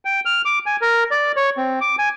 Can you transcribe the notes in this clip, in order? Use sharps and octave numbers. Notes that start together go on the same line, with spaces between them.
G5
F6
D6
G#5
A#4
D5
C#5
C4
D6
G#5